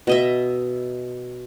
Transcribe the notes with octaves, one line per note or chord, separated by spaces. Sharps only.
B2 D#5 E5